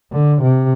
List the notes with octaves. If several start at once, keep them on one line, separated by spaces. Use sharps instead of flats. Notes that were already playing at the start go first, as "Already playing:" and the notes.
D3
C3